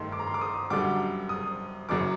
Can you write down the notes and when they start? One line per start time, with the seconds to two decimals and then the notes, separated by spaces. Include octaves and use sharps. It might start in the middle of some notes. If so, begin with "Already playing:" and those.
Already playing: G2 D#3 A3 C6
0.12 D6
0.19 A#5
0.27 C6
0.34 D6
0.41 D#6
0.70 F#2 D3 G3 D6
1.29 D#6
1.89 F#1 F#2 F#3 D6